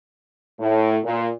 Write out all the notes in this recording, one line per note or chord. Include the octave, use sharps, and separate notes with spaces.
A2
A#2